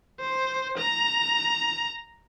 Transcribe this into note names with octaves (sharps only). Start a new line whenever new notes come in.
C5
A#5